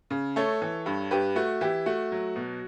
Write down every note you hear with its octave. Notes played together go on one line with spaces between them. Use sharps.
C#3
A3 A4 C#5
E3
G2
G2 G4 B4
A3 F#4
E3 E4 G4
A3 F#4
F#3
B2